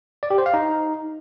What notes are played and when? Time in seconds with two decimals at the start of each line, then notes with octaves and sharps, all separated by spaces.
0.23 D5
0.30 G4
0.38 C5
0.46 F5
0.54 D#4